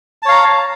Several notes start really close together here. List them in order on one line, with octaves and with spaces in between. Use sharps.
A5 C#5 F5 A#5